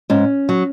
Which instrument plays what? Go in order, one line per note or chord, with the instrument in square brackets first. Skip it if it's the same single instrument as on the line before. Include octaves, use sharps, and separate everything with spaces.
[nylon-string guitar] G#2 C#4
F#3